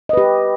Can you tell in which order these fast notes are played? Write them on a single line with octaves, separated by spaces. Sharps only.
D#5 B4 G4